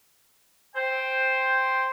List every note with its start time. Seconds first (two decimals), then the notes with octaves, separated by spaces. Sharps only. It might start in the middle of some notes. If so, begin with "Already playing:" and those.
0.76 C5 G5